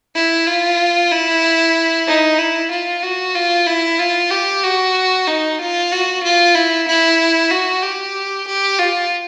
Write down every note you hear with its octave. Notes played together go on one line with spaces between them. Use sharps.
E4
F4
E4
D#4
E4
F4
F#4
F4
E4
F4
G4
F#4
D#4
F4
F#4
F4
E4
E4
F#4
G4
G4
F4